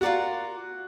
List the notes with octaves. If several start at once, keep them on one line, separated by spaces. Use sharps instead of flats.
F4 F#4 A#4 D5 F#5